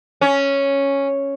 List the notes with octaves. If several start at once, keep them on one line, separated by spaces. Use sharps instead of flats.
C#4